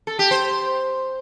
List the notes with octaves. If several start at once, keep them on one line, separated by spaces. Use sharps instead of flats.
A4
G4
C5